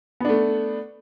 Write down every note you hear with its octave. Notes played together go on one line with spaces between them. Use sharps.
A3 B3 D4